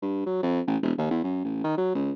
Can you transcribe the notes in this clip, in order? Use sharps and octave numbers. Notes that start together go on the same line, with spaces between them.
G2
F#3
F2
A1
E1
D#2
E2
F#2
A1
D#3
F#3
C#2